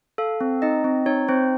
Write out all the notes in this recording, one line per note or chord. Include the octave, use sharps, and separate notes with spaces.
A4 F5
C4
D#4 D#5
C4
D#4 C#5
C4 C5